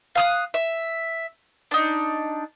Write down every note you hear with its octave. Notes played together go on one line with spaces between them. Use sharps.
F5 D#6 F#6
E5
D4 D#4